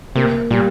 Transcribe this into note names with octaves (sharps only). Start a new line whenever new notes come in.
C3 A#3
A#2 G3